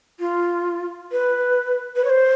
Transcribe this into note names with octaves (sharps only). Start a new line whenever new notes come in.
F4
B4
B4
C#5
C5